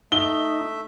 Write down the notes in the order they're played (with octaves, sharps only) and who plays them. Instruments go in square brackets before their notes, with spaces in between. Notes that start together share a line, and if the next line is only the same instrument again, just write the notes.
[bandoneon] A3 E5 [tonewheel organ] D#4 [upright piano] G7